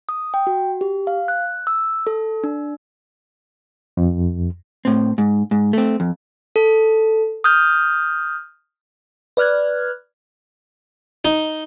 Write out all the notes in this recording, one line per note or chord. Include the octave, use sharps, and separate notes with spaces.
D#6
G5
F#4
G4
F5
F#6
E6
A4
D4
F2
A2 C4
G#2
G#2
A3 C4
F2
A4
D#6 F6 G6
B4 D5 F6 F#6 G#6
D#4